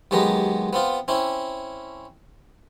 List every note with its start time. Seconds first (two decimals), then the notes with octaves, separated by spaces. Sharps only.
0.11 D#2 F#3 G#3 B3 G4 A#5
0.73 B3 C4 F4
1.08 C4 C#4 E4